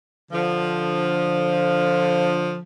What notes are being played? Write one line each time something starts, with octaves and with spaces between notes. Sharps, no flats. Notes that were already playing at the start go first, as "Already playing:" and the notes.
D3 F3